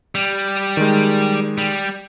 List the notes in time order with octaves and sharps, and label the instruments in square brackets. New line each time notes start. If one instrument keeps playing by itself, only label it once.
[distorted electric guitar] G3
[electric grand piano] D#3 G#3
[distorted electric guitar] G3